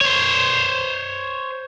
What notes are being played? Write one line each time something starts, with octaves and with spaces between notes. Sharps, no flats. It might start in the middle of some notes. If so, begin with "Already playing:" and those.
C5 C#5